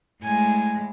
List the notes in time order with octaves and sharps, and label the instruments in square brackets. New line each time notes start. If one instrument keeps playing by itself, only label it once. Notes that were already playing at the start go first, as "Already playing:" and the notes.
[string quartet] A2 G#3 G#5